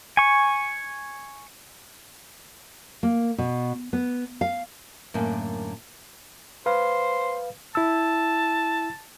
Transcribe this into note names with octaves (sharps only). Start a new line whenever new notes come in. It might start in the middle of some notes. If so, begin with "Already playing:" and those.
G#5 C#6
A#3
B2
B3
F5
F#2 A2 D3 A#3 G#5
B4 C5 F5
E4 A5 E6